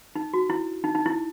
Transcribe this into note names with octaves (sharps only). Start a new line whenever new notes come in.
D#4
F#4
E4
D#4
D#4
E4